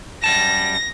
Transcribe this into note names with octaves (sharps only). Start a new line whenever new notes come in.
F#2 G3 A5 A#6